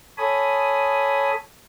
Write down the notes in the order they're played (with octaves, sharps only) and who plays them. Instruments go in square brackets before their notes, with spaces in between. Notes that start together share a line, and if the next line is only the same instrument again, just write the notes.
[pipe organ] A4 C#5 G#5 B5 D#6